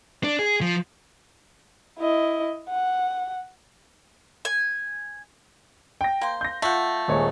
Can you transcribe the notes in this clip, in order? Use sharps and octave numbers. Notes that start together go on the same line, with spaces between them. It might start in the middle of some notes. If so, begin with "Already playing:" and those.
D4
G#4
F3
E4 D#5
F#5
G#5
G5 A#6
A#3 C5
G6 A#6
A3 F4 F#5
D#1 G#3 C#5